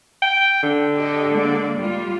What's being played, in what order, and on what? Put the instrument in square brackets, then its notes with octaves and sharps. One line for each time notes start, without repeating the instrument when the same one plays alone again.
[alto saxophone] G5
D3
[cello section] G4 A4 D#5
G#3 A#3 D5
G3 F4